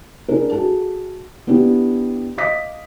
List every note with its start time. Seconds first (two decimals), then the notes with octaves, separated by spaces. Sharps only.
0.28 D4 E4 G#4 A#4
0.51 F#4 G#4 A4 A5
1.47 B3 D4 E4 G4
2.38 D#5 F5 D6 D#6 A#6 B6